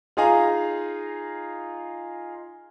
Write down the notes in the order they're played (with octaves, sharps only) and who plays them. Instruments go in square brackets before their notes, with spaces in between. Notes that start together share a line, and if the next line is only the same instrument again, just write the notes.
[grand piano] D#4 F4 G#4 F5 G#5 A#5